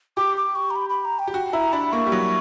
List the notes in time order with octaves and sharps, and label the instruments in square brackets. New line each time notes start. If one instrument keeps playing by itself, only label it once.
[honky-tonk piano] G4 [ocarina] D6
[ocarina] D6
C#6
A#5
B5
B5
A#5
G5
[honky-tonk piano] G4
[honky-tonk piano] F#4 [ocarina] G5
[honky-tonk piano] E4 [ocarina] A#5
[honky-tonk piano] D4 [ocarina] B5
[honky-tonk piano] A#3 [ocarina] C#6
[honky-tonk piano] G3
F#3